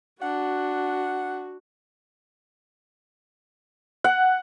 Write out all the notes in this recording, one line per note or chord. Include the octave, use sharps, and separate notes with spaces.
D4 F#4 F#5
F#5